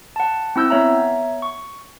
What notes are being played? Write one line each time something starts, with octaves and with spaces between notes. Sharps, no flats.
F#5 A5
C4 E4 E6 G6
B3 C#5 E5 A#5
C#6